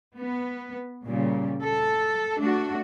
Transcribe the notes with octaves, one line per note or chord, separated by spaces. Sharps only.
B3
A#2 C#3 G3
A4
A3 D4 F#4